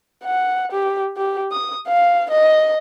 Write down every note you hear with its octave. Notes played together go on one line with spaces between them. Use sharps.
F#5
G4
G4
D#6
F5
D#5